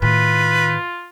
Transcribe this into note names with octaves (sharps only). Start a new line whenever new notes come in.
A2 D#3 F4 B4